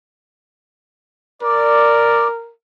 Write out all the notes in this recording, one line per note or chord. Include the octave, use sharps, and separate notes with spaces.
A#4 D5